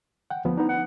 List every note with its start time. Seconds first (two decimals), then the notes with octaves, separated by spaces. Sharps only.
0.30 F#5 G5
0.45 D2 F3 B3
0.57 B3 D4 D#4
0.69 F#5